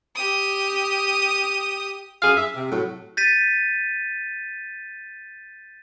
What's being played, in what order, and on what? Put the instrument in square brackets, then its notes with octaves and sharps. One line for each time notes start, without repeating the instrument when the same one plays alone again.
[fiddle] G4 D#6
[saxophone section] F#2 G#4 F5
E5
C3
A2 F#3 F#4
[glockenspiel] G6 A6 B6 D#7